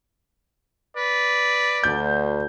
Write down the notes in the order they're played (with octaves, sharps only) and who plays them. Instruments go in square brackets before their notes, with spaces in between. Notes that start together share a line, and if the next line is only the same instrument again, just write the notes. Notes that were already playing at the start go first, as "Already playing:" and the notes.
[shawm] B4 [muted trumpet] D5
[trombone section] D2 [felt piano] G6